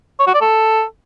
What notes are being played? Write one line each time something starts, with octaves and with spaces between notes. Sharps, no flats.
C#5
F#4
D5
A4